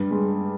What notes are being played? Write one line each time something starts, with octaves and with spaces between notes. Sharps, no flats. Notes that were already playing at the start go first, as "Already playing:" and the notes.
Already playing: G2 G3
G#3